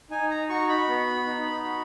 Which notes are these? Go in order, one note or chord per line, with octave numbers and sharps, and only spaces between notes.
D#4 G#5
A#5
F#4 C#6
B5
B3
D#4
F#4